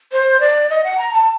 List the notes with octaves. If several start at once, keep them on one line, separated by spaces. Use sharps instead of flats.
C5
D5
D#5
F#5
A#5
A5